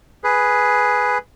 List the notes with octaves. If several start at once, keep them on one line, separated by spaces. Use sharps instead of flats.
G#4 B4